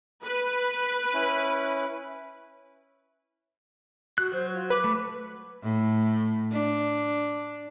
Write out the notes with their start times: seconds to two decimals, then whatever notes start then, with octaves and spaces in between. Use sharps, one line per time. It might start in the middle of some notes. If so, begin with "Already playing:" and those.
0.23 B4
1.14 C#4 E4
4.18 F#4 F#6
4.33 F#3 C5
4.53 F4
4.70 B4 D6
4.84 A3
5.63 A2
6.52 D4